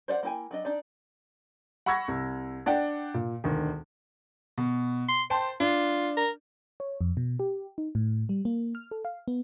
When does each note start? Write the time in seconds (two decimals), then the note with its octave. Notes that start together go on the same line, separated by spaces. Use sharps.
0.08 C5 D5 D#5 F#5
0.23 A#3 E4 G#4 G5 G#5
0.51 F#3 D4 D#5
0.65 D4 D#4 D5
1.86 F#5 B5 C#6 E6 G#6 A#6
2.08 C2
2.66 D4 D5 F#5 G5
3.14 A#2
3.44 E1 D2 D#3
4.58 B2
5.09 C6
5.30 C5 G5 A5 C6
5.60 D4 F4
6.17 A#4
6.80 C#5
7.01 F2
7.17 B2
7.40 G4
7.78 D#4
7.95 A2
8.29 G3
8.45 A#3
8.75 F6
8.91 A4
9.05 F5
9.28 B3